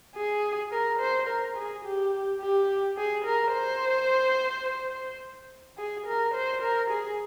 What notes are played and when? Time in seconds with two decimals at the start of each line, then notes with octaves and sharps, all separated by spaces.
0.16 G#4
0.72 A#4
1.00 C5
1.28 A#4
1.57 G#4
1.84 G4
2.41 G4
2.97 G#4
3.25 A#4
3.53 C5
5.78 G#4
6.07 A#4
6.34 C5
6.62 A#4
6.90 G#4